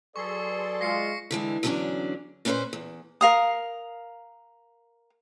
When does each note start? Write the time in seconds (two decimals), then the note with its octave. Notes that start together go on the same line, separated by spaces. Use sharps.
0.16 F#3 G#4 A4 B4 D5 C6 C#6
0.81 G#3 F4 A#6 C7 C#7
1.31 D3 E3 G#3
1.63 E2 D3 F#3 A3 C#4 D4
2.45 A#2 C#4 D4 F#4 B4 C5
2.73 E2
3.21 A#4 F5 D#6